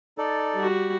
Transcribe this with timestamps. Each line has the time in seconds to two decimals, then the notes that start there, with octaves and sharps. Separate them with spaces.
0.18 D#4 A4 D5
0.55 G3 F#4